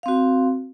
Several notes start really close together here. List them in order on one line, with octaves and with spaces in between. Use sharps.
F5 C4 F#4